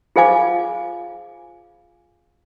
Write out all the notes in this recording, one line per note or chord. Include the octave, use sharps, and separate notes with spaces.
F4 G#4 C5 F5 G#5 D6